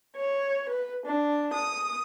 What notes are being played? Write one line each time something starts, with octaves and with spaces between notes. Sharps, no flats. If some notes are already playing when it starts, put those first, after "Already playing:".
C#5
B4
D4
D#6